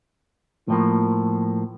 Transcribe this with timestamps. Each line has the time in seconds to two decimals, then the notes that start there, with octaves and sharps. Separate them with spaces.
0.68 A2 F3 A#3